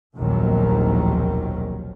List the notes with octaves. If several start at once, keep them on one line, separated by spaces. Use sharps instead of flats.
F1 A#1 D#2 B2 D#3 F#3